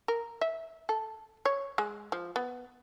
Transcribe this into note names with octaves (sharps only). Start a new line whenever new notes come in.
A#4
E5
A4
C#5
G#3
F3
B3